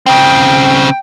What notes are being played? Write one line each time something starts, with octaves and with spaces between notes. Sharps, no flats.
C#3 C4 G5